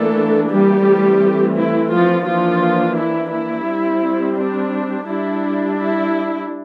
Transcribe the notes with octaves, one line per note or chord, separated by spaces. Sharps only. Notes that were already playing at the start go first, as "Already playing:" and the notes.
Already playing: E3 A3 A#3 D4 A4
G3 G4
E3 A3 C4
E4
F3 F4
E3 F3 A#3 D4 F4
E4
E4
G3 C4
D4
G3 D4 E4
E4